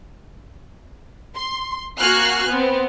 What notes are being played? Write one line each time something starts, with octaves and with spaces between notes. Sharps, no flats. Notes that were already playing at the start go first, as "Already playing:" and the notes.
C6
A#3 F#4 G#5 F6 F#6 C7
B3 C4